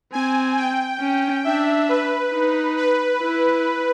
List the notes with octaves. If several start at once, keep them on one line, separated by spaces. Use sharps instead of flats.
C4 G#5
G5
C#4
D4 E5
B4
D#4
B4
E4